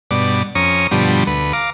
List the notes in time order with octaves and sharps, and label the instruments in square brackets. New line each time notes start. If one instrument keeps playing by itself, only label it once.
[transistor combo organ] G2 B2 D5
F2 C#4 A#5 C#6 D#6
G2 B2 D3 F3 G3
D2 B4
F5 A#5 D6